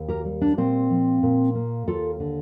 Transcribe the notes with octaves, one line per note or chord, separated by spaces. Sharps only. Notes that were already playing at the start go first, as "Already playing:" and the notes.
Already playing: D#2
G4 A#4
G3
D4
A#2 C4
F3
A#2
A#3
D#2 F4 A4
D3